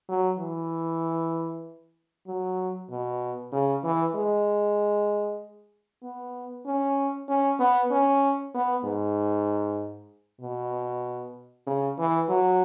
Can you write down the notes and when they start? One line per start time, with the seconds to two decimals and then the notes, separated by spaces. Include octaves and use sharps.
0.09 F#3
0.40 E3
2.27 F#3
2.90 B2
3.52 C#3
3.84 E3
4.15 G#3
6.03 B3
6.66 C#4
7.29 C#4
7.60 B3
7.91 C#4
8.54 B3
8.84 G#2
10.41 B2
11.67 C#3
11.99 E3
12.29 F#3